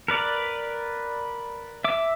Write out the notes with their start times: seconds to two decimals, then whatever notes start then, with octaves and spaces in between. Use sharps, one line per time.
0.08 A#4 B4 D5
1.84 E5 D6